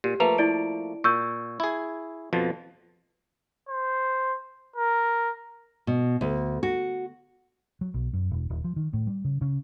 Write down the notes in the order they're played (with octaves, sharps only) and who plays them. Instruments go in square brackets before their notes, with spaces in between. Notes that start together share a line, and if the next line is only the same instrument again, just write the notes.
[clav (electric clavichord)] A#2 [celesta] G4
[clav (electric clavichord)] F3 A3 A#3 [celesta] B4 A#5 F7
[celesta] E4 D5 D7
[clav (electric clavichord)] A#2 [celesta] C#6 E6 G6
[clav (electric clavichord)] E4 G#4
F2 B2 F3
[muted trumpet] C5
A#4
[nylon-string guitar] B2
D2
F#4
[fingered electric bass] F#3
B1
F#2
E1
D#1
F3
D#3
A2
G3
C#3
C#3